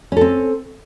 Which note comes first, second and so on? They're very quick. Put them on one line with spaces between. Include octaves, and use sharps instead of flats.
C#4 A4 C4